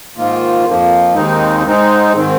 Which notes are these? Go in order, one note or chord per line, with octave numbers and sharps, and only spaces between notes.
G#2 D#3 A#3 F4
F2 F3 A#3
D#2 D#3 G#3 C4 D#4
G#2 G#3 C4 D#4
G#2 D#3 C4